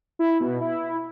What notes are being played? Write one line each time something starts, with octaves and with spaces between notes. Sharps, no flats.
E4
B2
E4